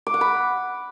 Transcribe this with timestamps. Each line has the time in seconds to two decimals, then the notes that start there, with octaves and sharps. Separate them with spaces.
0.07 D6
0.14 F#5
0.21 B5